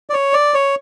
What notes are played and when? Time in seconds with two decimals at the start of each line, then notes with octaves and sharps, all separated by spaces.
0.10 D5
0.13 C#5
0.33 D5
0.54 C#5